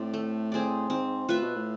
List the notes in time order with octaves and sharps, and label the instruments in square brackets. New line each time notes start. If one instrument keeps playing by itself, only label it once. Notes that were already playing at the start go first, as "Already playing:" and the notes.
Already playing: [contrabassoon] A2 [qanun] C4 D5
[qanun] A3
C4 G#4 D5
[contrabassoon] G#2 [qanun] C4
[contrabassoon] A2 [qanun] F4 B4 E5
[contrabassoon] B2
A2